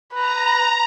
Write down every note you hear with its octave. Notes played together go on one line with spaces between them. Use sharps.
B4 A#5